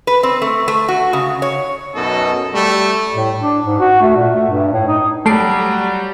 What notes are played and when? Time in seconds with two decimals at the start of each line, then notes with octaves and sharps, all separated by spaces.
0.07 B4
0.23 C4
0.42 A3
0.68 A3
0.88 F#4
1.13 C#3
1.42 C#5
1.94 F#2 B2 D#4 A4 D#5
2.54 G3 A3
3.14 A2
3.40 D4
3.66 G#2
3.79 F#4
4.02 A3
4.16 A#2
4.35 A3
4.50 G2
4.73 A2
4.88 D#4
5.26 F#3 G3 A3 C7 D7